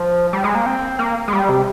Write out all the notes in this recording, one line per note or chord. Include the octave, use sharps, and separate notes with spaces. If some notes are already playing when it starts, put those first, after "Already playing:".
Already playing: F3
G3
G#3
A#3
C4
A#3
G#3
G3
C3